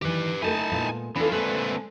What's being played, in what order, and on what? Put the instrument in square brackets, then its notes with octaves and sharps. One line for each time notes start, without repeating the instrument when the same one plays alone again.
[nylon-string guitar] D#3 E3 [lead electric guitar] G4 B4
[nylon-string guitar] A3 G#4 A#4 [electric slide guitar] D#4 E4 [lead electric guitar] G#5 A5
[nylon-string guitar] A#2 G#3 B3
[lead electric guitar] E3 [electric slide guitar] B3 F4 [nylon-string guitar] D4 A4
[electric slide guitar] A#2 A3 C4 [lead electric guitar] D3 B4 [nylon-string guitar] G#3